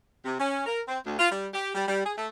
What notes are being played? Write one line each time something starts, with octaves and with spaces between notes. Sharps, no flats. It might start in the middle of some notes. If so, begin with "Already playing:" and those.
C3
C#4
A#4
C4
D2
F4
G3
G4
G3
G3
G#4
A3